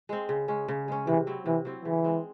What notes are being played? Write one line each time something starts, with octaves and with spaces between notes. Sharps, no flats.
G#3 C4
C#3
G#3 C#4
C#3
G#3 C#4
C3 E3
F#3 C4 E4
C3 E3
F#3 C4 E4
C#3 E3
G#3 C4